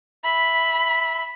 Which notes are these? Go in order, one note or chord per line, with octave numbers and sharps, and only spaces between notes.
E5 B5